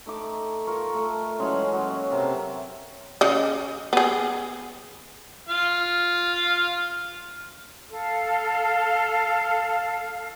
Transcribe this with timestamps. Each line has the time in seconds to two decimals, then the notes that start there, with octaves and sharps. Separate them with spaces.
0.06 A3 D#4 D6
0.67 F4 A#4 C#6
0.94 A3
1.39 E3 F#3 G#3 C#4
1.73 F#3 A#3
2.12 C3 A#4 A5 C6
3.21 C#3 D#5
3.93 B3 G#4
5.49 F4 F5 F6
7.90 A4 F5